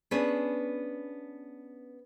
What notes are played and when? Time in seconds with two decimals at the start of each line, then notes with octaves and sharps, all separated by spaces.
0.11 B3 C#4 D4 G#4 B4